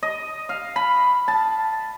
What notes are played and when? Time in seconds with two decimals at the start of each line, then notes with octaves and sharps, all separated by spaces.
0.03 D#5
0.49 F5
0.76 B5
1.28 A5